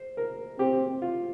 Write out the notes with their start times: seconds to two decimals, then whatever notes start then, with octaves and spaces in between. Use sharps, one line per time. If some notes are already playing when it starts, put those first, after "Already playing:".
Already playing: C5
0.17 A#4
0.59 C4 G4
1.02 F4